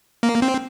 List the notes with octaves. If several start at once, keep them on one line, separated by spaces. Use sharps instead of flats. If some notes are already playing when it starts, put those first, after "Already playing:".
A#3
C4